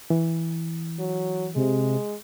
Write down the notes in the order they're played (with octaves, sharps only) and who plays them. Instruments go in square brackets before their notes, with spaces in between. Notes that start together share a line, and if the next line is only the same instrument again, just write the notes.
[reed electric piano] E3
[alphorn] F#3
[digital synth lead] C3 [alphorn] G#3